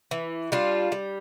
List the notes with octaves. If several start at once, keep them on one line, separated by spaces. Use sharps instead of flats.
E3
G3 D4 F4
G3